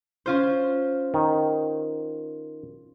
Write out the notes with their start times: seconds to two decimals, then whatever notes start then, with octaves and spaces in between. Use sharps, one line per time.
0.26 C#4 F4 C5
1.14 D#3